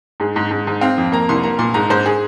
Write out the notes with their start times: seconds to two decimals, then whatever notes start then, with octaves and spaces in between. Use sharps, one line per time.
0.20 G#2 G#4
0.36 G#2
0.51 G#2
0.67 G#2
0.81 C4 F5
0.98 F2
1.12 A#3 A#5
1.29 C2 C6
1.43 A#3 A#5
1.59 A#2 C6
1.74 G#2 A#5
1.90 G#2 C5
2.06 G#4